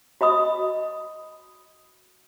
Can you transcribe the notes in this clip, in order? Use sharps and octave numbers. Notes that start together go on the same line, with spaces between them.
F#4 D#5 B5 D#6